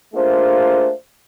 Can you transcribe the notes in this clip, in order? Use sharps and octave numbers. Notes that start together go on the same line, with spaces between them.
A3 A#3 D4 F4 G#4 C5